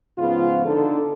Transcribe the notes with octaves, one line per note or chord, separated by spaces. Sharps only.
G#2 C#3 F3 B3 F4
D3 D#4 A4